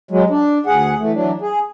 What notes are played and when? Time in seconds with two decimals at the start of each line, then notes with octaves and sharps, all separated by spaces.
0.11 F#3 G#3
0.30 D4
0.66 D2 G#4 F#5
1.00 E3 A3
1.13 E3 F#3 D4
1.41 G#4